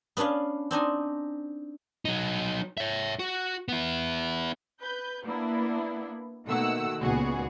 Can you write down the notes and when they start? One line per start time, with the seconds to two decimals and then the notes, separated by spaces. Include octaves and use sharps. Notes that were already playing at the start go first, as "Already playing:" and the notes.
0.17 B3 C#4 D4 B4 F5
0.71 C4 D4 D#4 G#5
2.05 F#3 D#4
2.77 C#5 E5
3.19 F#4
3.68 B3 E4
4.81 B4 G6
5.24 A#3 B3 D4 E4
6.45 B2 D#3 A3 A#3 F#5 E6
7.01 C#2 A#2 D#3 B3 F#4 G#4